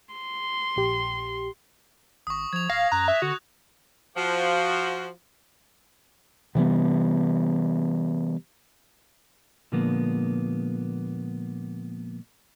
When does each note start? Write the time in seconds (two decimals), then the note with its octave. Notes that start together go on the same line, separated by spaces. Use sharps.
0.14 C6
0.76 A#1 G4
2.27 G#1 C#6 D#6
2.53 F3 G#6 F7
2.70 D1 F5 A#6
2.92 F#2 A#5 F#6
3.08 E5
3.22 D3 F#4
4.17 F3 F#4
6.55 C3 E3 G3 B3
9.72 A#2 D3 F3 G#3 A#3 B3